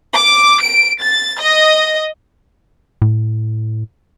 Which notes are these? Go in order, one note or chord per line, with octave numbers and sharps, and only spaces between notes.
D6
D7
A6
D#5
A2